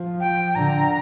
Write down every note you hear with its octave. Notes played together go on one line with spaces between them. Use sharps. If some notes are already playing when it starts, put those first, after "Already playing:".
Already playing: F3
G5
D3 A#5